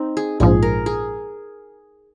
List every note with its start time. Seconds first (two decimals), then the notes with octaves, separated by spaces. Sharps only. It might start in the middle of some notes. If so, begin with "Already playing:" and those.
Already playing: C4 D#4
0.17 G#4
0.40 A#1 G#2 F3 G#4
0.63 A#4
0.86 G#4